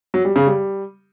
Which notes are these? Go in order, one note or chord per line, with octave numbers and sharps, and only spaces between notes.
F#3
G3
C#3
G3